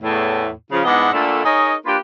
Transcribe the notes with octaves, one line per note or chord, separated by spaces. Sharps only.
E2 A2
C#3 F3
G#2 B3 D4 E4 D#5 F#5
A#2 D3 A3
D#4 G#4 A#4 C#5 D#5
A#3 D4 F4 G4 B4